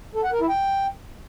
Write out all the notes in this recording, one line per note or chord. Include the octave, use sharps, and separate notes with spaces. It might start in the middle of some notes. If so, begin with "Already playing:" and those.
A4
F#5
A#4
E4
G5